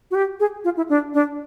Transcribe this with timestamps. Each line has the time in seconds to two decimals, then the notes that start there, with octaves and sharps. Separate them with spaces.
0.11 F#4
0.15 G4
0.40 G#4
0.64 F4
0.77 E4
0.89 D4
1.14 D4